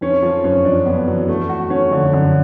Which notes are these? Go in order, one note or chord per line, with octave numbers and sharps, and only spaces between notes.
F2 C#4
F2 F3
F#2 C#4
F2 D4
F2 B3
E2 F#3
A3
F#4
C#4
F2 D3
F#2 D3